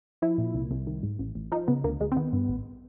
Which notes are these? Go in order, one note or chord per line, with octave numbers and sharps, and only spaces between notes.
F3 E4
A#2
C2
C2
D#3
G#2
A1
A1
F3 D#4
C#3 B3
D2 A#3
D2 G#3
C4
D#3 B3
G2
A1